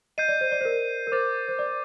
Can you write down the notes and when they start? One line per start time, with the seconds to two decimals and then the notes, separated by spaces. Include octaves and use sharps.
0.18 D#5 G6 C7 D#7
0.28 D5
0.41 C5
0.52 D5
0.61 C5
0.65 A#4
1.07 A#4
1.12 C5 D6 A6 D#7
1.48 C5
1.59 D5